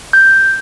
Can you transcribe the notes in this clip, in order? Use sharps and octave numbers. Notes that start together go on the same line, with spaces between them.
G6